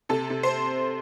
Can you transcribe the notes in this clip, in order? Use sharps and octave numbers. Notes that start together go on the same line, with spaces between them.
C3 A4
C3
C5